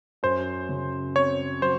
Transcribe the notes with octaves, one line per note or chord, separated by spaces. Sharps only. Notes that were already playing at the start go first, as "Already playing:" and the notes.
F#2 C5
C#3
C4 C#5
F#3 C5